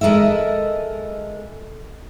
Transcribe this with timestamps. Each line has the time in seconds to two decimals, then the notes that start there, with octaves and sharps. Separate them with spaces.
0.01 G#3 A4 A#4 D#5 E5